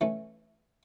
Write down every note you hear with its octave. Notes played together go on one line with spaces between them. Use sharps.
E3 A3 C#4